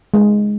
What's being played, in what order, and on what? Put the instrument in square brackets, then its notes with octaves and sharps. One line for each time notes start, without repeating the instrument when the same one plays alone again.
[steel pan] G#3